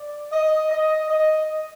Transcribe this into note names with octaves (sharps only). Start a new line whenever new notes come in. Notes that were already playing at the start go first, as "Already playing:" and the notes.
Already playing: D5
D#5
D#5
D#5